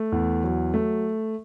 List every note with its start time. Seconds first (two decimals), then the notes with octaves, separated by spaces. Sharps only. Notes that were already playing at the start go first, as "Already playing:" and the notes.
Already playing: A3
0.12 E2
0.44 F#3
0.74 A3